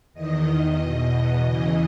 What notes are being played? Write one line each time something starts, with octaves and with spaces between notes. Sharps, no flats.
E2 D#3 D#5
E2 B2
E2 C#3 E3